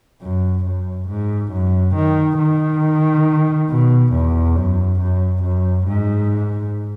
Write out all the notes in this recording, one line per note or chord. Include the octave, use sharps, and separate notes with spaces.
F#2
F#2
G#2
F#2
D#3
D#3
B2
E2
F#2
F#2
F#2
G#2